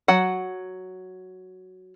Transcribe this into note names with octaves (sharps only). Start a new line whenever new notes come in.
F#3 F#5